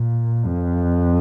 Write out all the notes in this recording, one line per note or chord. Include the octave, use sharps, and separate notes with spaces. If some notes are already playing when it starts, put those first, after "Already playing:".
Already playing: A#2
F2